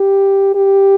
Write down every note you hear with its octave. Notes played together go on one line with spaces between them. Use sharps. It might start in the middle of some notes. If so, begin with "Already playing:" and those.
Already playing: G4
G4